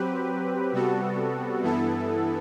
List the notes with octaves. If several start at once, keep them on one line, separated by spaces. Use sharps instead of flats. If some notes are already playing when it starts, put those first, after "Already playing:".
Already playing: F#3 C4 G4 B4
C3 G3 B3 F#4 A4
G2 E3 B3 E4 A4